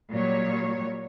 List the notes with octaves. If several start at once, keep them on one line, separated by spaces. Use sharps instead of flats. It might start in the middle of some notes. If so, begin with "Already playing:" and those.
A#2 F#3 G3 C#5